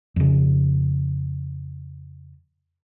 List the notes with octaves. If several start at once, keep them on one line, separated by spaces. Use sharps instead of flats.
F2 C#3